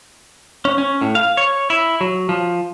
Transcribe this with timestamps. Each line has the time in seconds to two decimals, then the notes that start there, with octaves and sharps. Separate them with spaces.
0.65 C#4
0.78 C#4
1.02 A2
1.15 F5
1.37 C#5
1.70 E4
2.01 F#3
2.29 F3